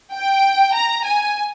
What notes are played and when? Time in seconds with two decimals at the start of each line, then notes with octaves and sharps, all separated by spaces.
0.13 G5
0.75 A#5
1.05 G#5